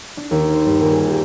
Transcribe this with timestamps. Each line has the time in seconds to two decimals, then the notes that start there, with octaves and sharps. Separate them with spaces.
0.17 D4
0.31 D#2
0.54 C5
0.66 G2
0.81 D#1
0.93 G#4
1.09 G4